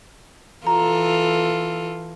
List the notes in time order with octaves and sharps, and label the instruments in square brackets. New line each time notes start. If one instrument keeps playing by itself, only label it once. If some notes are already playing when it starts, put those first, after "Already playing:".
[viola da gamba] E3 F4 A4 [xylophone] A#5